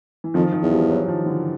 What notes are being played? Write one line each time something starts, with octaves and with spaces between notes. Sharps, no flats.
E3
F2 D#3 F3
D#3 F3
E2
F3 G3
E3 F#3
D#3 F3
D3 E3